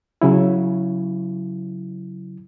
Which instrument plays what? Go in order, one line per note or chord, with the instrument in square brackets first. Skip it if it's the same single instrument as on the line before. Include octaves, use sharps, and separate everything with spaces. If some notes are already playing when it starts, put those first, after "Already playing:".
[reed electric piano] C#3 F#3 E4